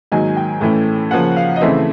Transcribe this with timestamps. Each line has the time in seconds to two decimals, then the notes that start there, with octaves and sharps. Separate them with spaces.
0.12 G#2 D#3 F#3 A#3 G#5
0.37 G5
0.61 A2 E3 A3 C#4
1.11 C#3 F3 A#3 C#4 F#5
1.36 F5
1.56 D#5
1.61 C#3 E3 A3 C4 E5